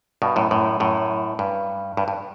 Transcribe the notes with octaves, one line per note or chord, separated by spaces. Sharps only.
G2 B2
F#2 A2
F#2 A2
F#2 A2
G2
G2
G2